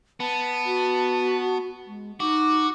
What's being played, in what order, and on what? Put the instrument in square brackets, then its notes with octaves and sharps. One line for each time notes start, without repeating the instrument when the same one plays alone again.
[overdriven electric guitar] B3 [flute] A5
[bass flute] F#4
G#3
[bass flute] D#4 [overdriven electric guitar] F#4 [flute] D6